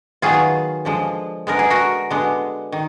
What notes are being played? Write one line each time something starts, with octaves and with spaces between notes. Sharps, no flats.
D#3 F#3 B3 F4 G#4
D3 F3 G#3
D3 G#3 B3 A#4
G#4
F#4 A#4
D3 G#3 B3
D#3